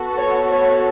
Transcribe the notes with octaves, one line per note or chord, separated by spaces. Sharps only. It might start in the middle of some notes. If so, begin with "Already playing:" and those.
Already playing: B3 F#4 A4
C#5
C#5